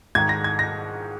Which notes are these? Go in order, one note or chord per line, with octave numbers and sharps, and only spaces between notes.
G#2 D#3 G#6
A#6
G#6
A#6